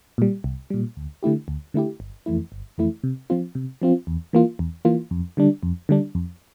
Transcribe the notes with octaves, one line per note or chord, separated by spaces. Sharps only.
A#2 G3
C2
A#2 G3
D2
D3 A3 E4 G4
D2
D3 A3 E4 G4
G1
F2 E3 A3 E4
G1
F2 E3 A3 E4
C3
F3 C4 F4
C3
F3 C4 F4
E2
E3 A#3 F4
E2
E3 A#3 F4
F2
D3 G3 D4
F2
D3 G3 D4
F2